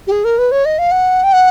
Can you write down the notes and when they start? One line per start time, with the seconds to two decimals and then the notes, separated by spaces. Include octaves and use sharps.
0.07 G4
0.12 G#4
0.24 A#4
0.38 B4
0.52 C#5
0.65 D#5
0.79 F5
0.92 F#5
1.24 G5
1.33 F#5